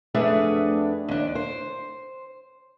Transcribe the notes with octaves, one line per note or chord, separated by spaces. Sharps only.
F2 A3 D4 G#4 B4 F#5
D#2 D4
C5